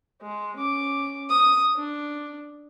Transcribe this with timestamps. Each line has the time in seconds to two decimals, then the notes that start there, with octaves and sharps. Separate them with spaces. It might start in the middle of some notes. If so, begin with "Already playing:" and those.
0.22 G#3
0.56 C#4 D6
1.29 D#6
1.77 D4